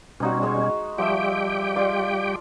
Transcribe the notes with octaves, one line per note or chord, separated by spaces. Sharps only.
B2 G3 C4 C#4 D#4 F#4
G#3 C#6
F3 G3 G4 E5 G5
F4 D5